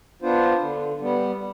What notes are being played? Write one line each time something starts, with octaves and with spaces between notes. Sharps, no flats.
B3 D4 F4 C5
D3
G3 B3